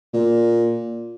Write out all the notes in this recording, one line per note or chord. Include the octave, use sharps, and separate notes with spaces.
A#2